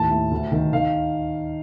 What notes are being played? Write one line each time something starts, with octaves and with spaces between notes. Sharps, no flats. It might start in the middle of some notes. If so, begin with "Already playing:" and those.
Already playing: D#2 A2 A5
A2
D2
D#3
D#3 F5